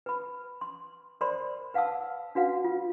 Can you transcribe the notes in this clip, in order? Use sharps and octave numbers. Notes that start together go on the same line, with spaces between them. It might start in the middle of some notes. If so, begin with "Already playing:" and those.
B4 B5
C6
A#4 C5 D5 B5 C6
B4 F5 F#5 A5 E6
D4 F#4 B4 F5 F#5
F4